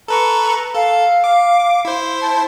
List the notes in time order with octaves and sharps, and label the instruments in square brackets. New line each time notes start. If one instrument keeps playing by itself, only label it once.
[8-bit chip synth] A4 B4 C#6 [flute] A#5
[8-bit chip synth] A4 [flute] F5
[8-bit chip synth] D6
E4 C5
[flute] A5